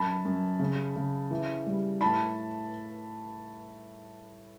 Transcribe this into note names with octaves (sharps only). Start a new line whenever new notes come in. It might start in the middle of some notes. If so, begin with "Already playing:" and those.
Already playing: F#2 A5 B5
F#2
C#3
C#3
E3
G3
A2 A5 B5